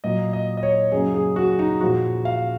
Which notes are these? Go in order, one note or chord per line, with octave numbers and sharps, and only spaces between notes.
A#2 F#3 A#3 D#5
D#5
D#5
C#5
F#2 C#3 F#3 A#3 G#4
G#4
F#4
D#4
A#2 F3 G#3 F#4
F5